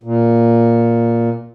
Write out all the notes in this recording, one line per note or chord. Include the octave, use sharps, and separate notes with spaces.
A#2